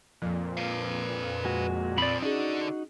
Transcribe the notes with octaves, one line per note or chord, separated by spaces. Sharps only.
F2 A#2 F3
B4 F5
G#3 F#4
F3 C4 D5 B5
D3 C#4 D#4 F#4 G#4 D5